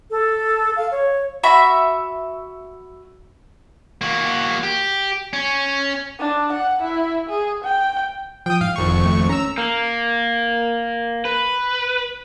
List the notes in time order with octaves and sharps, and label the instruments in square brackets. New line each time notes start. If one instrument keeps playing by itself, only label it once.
[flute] A4
F5
C#5
[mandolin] F#4 E5 B5
[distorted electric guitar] A#3 F#4
G4
C#4
[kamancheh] D4
F#5
E4
G#4
G5
[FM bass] F3 [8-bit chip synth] G5 D#6
[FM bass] G#2 [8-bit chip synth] F5
[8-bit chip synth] G#1 F2 C#6
[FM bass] F1
A3
[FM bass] C#4 [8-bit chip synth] A#5 E6
[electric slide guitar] A#3
B4